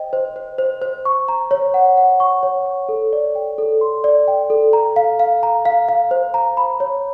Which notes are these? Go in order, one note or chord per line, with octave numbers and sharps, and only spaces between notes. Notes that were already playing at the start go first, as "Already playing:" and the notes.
Already playing: C5 D#5 G5
C5
C5
C5
C5
C#6
A#5
C#5
F#5
F#5
C#6
C#5
C#6
A4
D5
G5
A4
C6
D5
G5
A4
A#5
F5
F5
A#5
F5
F5
C5
A#5
B5
C#5